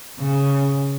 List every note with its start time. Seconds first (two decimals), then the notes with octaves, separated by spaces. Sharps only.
0.20 C#3